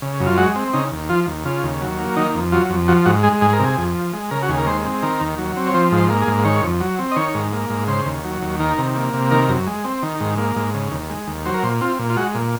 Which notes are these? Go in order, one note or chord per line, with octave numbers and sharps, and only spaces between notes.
C#3
F#2
F4
G#3 F#4
C4
C#3 D#4
D#2
F3 F4
D#2
C#3 F4
D#2
F#3
A#3
D#3 D#4
F2
F#3 F4
F2
F3 F#4
G#2 F#4
G#3 G#4
G#2 G#4
A#4
C3
G#4
F2
F3
G#3
C#3 A#4
F#4
D#2 G#4
A#4
G#3 C5
C4
D#3 A#4
D#2
F#3
C4
C#5
F3 C5
G#2
C5
A#3
G#4
G#2
D#3 C#5
F2
F#3
C4
D#5
D#3 C#5
G#2
A#3
G#2
C#3 C5
D#2
F#3
D#2
D#3 A#4
C3
A#3
C3
D#3 A#4
F#2
G#3
C4
D#3
G#2
A#3
G#2
C#3
D#2
G#3
D#2
F#3 C5
A#4
A#2 C5
C4 F4
A#2
F4
G#3 F#4
A#2